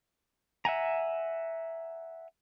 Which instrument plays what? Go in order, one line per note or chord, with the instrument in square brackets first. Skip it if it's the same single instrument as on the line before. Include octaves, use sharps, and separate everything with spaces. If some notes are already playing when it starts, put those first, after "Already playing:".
[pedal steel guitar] E5 F#5 G#5 A#5